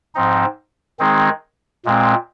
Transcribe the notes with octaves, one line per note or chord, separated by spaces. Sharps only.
G#2 F3 C4 D#4
D#3 G#3 C4 D#4 G#4
A#2 G#3 C4